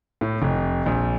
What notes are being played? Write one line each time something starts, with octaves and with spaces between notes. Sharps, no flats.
A2
F1
A#1